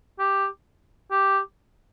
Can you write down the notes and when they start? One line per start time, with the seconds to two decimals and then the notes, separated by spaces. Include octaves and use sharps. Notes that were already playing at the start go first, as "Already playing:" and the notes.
0.19 G4
1.11 G4